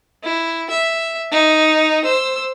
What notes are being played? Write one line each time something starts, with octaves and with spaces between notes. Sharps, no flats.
E4
E5
D#4
C5 E6